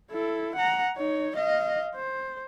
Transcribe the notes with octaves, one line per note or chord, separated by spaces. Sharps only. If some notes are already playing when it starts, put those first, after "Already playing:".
E4 A4
F#5 A#5
D#4 C#5
D#5 F5
C5